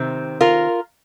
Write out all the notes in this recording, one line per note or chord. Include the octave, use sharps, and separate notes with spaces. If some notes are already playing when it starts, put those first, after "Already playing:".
Already playing: C3 D#3 C4
F4 A#4